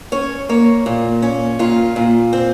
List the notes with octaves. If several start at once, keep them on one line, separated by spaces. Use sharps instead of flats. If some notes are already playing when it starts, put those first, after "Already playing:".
C#4 C#5
A#3 C#5
A#2
C#4
A#2 F4
A#2
C4